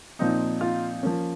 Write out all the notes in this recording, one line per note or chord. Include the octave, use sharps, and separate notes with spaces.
A#2 F3 C4 D#4
F4 F5
F3 A#3 C#4